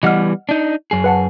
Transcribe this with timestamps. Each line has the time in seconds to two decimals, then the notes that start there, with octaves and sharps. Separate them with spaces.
0.03 E3 G3 B3 D#5 F#5 F6
0.49 D4 D#4
0.91 F#2 G#4
1.04 B4 F#5 A5